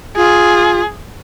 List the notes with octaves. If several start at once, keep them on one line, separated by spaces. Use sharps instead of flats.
F4 G#4